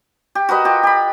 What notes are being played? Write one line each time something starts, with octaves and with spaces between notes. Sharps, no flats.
G4
F#4 A#4 B4 D#5
F4 G4
G4 B5